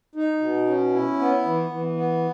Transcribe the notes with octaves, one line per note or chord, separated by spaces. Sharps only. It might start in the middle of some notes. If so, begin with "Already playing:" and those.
D#4
B2
C#4
E4
B3
E3
E3
B3